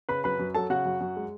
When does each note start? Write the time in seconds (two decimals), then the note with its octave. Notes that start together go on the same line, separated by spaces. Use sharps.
0.09 C#3 B4 B5
0.24 F#2 B4 B5
0.39 F#2
0.55 F#3 A4 A5
0.70 C#3 F#4 F#5
0.85 F#2
1.00 F#2
1.16 G#3